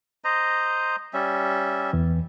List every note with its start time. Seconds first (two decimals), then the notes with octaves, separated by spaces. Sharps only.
0.24 C5 D#5 A#5
1.13 G3 C#4 E5
1.93 E2 E3